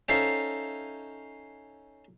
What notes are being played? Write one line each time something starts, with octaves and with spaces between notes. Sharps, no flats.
C#4 D#4 A4 C5 E5 F5